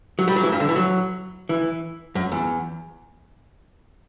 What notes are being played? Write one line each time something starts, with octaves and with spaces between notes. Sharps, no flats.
F#3
G3
F#3
E3
G2
D3
E3
F#3
E3
F#2
E2